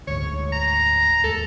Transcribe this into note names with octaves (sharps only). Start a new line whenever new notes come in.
D2 G#2 C#5
A#5
D#2 G#3 A4